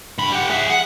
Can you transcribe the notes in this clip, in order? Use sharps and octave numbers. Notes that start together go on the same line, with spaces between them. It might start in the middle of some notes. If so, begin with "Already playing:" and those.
G2 B5
G4 F#5
G#4 E5
F#5